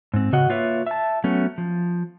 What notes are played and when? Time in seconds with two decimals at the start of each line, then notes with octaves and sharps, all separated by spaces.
0.14 G#2 C4
0.33 C#3 F#4 D#5 F#5
0.49 A#3 F4 B4 C#5 E5
0.86 E5 A5
1.24 F#3 A3 B3 C#4
1.58 F3